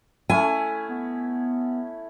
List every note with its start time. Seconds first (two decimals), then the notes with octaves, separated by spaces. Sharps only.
0.30 A3 C#4 E4 G#5
0.89 B3